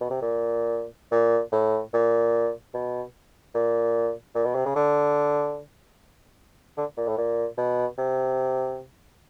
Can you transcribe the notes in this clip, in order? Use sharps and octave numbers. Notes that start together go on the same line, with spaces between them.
B2
C3
A#2
A#2
A2
A#2
B2
A#2
A#2
B2
C3
C#3
D3
D3
A#2
A2
A#2
B2
C3